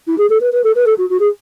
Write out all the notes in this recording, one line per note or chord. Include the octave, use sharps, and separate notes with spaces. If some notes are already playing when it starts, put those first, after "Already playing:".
E4
G#4
A4
B4
B4
A4
B4
A4
F#4
F#4
G#4